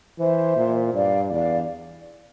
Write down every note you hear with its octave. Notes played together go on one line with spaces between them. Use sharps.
E3 C5 E5
A#2
G2 D5 F5
E2 D5 F5